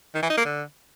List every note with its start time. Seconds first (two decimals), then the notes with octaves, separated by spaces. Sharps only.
0.15 D#3
0.22 E3
0.30 D#4
0.38 A#3
0.45 D3